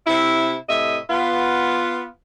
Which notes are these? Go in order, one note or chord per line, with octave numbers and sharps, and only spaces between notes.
C3 E4
A2 C3 D#5 E5
B3 F4